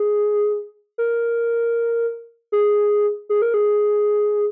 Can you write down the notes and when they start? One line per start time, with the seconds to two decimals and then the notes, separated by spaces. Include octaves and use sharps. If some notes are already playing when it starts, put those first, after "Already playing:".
Already playing: G#4
0.98 A#4
2.52 G#4
3.29 G#4
3.42 A#4
3.54 G#4